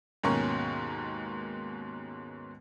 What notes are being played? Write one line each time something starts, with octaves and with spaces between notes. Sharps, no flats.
D#2 G#2 B2 C#4 A#4 C#6